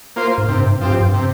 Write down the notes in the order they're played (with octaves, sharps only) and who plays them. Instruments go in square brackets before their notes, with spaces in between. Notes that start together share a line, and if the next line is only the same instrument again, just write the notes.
[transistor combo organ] A#3 F4 C5
[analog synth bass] G#2
[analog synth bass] G2 [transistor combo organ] C3
[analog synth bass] G#2
G2
[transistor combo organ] F3 C4 G4
[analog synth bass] G2
[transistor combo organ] C3